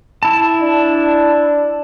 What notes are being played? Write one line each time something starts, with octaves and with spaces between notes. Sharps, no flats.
E4 A5
D4